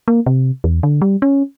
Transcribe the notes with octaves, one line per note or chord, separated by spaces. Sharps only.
A#3
C3
E2
D3
G3
C#4